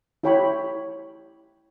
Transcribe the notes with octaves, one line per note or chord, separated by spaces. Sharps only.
E4 G4 C#5 G5 B5